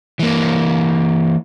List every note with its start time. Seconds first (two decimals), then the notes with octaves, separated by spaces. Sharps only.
0.19 E3 A#3